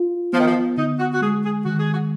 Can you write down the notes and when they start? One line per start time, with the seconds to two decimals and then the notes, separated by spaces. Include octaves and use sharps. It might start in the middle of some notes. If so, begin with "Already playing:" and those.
Already playing: F4
0.33 F3 B3
0.40 D#3
0.47 F3
0.77 D3 D#4
0.99 F#4
1.13 F#4
1.21 G#3 G#4
1.44 G#4
1.65 D#3 F#4
1.79 G#4
1.93 F#4